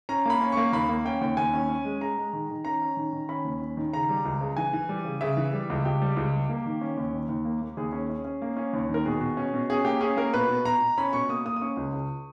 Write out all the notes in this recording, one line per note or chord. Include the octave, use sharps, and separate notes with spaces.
C#4 A#5
A#3 B5
C#4
A#3 C#6
D#2 B5
A#3
C#4 G5
D#2 G5
D#2 G#5
C#4
C#4
G#3
G#3 A#5
G#3
D#3
D#3
C#4 A#5
C#4
D#3
D#3
C#4 B5
D#2
C#4
D#3
C#3 A#5
G3
C#2
C#3
E3 G#5
E3
G3
C#3
C#3 E5
E3
G3
C#2
C#2 G4
G3
C#2
G3
A#3
D#3
C#4
D#2
D#3
D#2
A#3
A#3
D#2 G#4
C#4
C#4
C#4
A#3
C#4
D#2
D#3
A#4
B2 G#4
B2
C#4
B2
C#4 G#4
A#3 G4
C#4 G#4
A#3 A#4
B2 B4
B2
B2 A#5
B2
C#4 B5
B2 C#6
A#3 D#6
A#3 D#6
D#6
C#4 C#6
C#2
C#2